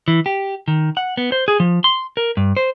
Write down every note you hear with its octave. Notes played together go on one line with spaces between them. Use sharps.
E3
G4
D#3
F#5
B3
C5
G#4
F3
C6
A#4
G2
C5